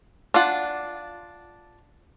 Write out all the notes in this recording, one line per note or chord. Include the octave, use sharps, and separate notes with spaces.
D4 F4 F#5